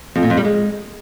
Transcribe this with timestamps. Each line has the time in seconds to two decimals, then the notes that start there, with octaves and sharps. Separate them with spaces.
0.16 F2
0.23 A#2
0.30 F2
0.37 G3
0.45 G#3